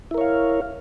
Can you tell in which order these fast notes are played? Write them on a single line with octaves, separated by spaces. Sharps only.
E4 A#4 C#5 F5